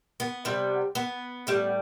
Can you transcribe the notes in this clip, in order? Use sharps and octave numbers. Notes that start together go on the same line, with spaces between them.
B3
C3 G3
B3
A2 G3